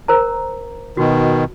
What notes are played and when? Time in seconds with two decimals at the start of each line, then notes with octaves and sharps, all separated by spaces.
0.08 A#4 C5 A#5
0.97 B2 D#3 F#4